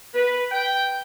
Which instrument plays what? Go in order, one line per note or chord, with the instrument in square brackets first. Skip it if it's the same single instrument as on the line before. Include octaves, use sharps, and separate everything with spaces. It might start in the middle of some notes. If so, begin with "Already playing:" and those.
[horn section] B4
G5